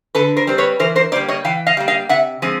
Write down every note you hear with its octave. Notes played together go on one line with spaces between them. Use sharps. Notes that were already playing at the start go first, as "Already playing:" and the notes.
D3 A4 B4
A#4 C5
G3 C4 C5
B4 C#5
E3 A#4 C5
A#4 C5
G3 A#3 C5 D5
C#5 D#5
E3 F5 G5
D#5 F5
G3 A#3
D#5 F5
C3 E5 F#5
F3 G#3 C4